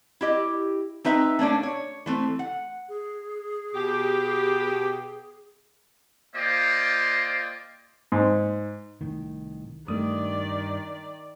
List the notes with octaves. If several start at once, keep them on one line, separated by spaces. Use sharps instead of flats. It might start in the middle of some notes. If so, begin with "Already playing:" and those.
E4 G4 D#5
C4 D#4 B4 E5 A#5
A3 A#3 C#4 D4
C#5
E3 A3 C4
F#5
G#4
B2 G4
A#3 F4 C5 D5 D#5 G5
G#2
C2 A2 D#3
G2 D#3 A3 D5 D#6